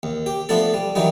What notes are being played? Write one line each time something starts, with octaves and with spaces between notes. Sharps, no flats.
D#2
G4
F3 A3 B3 D4 A4
G3
D#3 E3 F#3 G3 D#4